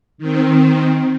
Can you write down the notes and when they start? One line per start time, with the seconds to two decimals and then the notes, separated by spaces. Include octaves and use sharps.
0.18 D#3 C4